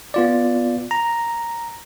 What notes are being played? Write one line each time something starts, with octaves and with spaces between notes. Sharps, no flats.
B3 F4 D5
A#5